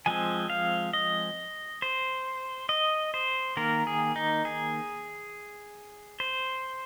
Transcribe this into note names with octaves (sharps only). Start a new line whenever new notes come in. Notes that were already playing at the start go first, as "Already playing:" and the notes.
F3 G#3 C4 G#5
F5
D#5
C5
D#5
C5
D#3 A#3 A#4
G#4
D#4
G#4
C5